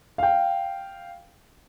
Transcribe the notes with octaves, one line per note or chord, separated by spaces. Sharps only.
F5 G5